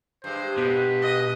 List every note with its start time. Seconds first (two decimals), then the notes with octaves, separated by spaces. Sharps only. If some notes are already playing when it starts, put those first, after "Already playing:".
0.24 G2 G#3 C5
0.58 B2 B4
1.01 D#5